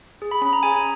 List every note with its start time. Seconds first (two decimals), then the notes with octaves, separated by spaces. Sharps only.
0.22 G#4
0.31 B5
0.42 C#4 B5
0.53 A#5
0.63 G#4 G#5